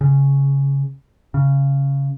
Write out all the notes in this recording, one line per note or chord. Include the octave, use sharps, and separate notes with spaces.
C#3
C#3